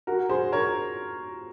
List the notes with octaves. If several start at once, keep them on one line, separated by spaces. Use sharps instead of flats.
F#4 A#4
G#4 C5
A#4 C#5